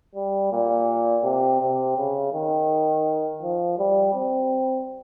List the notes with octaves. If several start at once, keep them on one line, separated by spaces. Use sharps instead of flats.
G3
A#2
C3
C3
C#3
D#3
F3
G3
C4